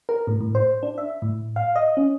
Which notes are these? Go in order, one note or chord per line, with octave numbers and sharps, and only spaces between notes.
A#4
A2
A2
C5
D4
E5
A2
F5
D#5
C#4